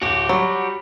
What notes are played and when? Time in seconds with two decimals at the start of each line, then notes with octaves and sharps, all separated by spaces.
0.02 D1 F#4 G4
0.29 F#3 G3